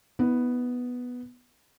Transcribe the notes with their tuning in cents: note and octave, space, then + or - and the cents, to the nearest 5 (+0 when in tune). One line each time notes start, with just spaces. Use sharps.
B3 +0 E4 -40